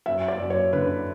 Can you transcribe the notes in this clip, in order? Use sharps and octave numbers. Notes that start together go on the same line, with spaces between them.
F#2 E5
D5
F#2
C#5
D3 B4